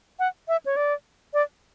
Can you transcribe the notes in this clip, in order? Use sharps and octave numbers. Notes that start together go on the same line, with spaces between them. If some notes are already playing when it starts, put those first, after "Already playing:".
F#5
E5
C#5
D5
D5